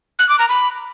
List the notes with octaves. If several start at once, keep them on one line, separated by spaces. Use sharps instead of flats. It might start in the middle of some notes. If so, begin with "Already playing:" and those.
F#6
D6
A#5
B5